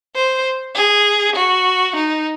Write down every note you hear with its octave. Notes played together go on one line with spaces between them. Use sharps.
C5
G#4
F#4
D#4